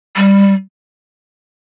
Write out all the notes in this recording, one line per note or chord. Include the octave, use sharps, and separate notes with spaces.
G3